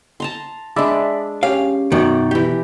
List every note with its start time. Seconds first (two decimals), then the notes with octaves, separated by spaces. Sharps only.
0.20 A5 A#5 C6
0.76 G#3 D4 D5 E5 B5
1.43 C#4 G4 F5
1.92 F#2 B2 D#3 D5
2.31 E3 G4